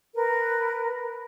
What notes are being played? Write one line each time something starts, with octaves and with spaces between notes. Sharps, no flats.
A#4 B4